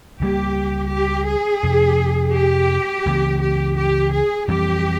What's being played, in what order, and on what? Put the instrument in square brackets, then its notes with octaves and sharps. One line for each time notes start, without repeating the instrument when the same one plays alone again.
[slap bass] C#2 C3 G3 A#3 [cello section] G4
[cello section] G4
G#4
[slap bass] F2 C3 F3
[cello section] G4
[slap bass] C#2 C#3 E3 A#3
[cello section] G4
G4
G#4
[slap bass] F2 E3 G3 C4 [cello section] G4